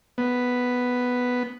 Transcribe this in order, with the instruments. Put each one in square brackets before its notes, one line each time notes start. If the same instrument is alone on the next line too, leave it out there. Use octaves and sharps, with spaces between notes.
[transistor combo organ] B3